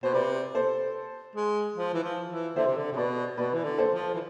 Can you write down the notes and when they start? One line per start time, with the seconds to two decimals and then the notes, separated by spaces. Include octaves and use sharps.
0.03 B2 C5
0.14 C3 B4 D5
0.55 A4 C5
1.36 G#3
1.76 F3
1.94 E3
2.03 F3
2.30 E3
2.56 D3 C5 E5
2.66 C3
2.77 D3
2.92 C3
2.96 B2 B4 D5
3.37 B2 B4 D5
3.54 E3
3.64 D3
3.78 A4 C5
3.92 F3
4.14 E3